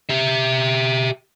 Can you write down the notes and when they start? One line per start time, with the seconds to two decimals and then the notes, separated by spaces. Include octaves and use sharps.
0.10 G4 E5